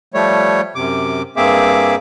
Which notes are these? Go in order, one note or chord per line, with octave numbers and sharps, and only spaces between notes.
F3 G3 A3 C#5
F#2 C3 D6
G2 A#3 C4 G#4 E5 D6